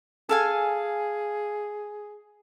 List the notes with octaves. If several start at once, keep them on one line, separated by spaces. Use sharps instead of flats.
G#4 A4 F5 G#5